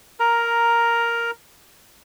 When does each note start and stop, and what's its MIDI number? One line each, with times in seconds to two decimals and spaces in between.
0.20 1.31 70
0.20 1.31 82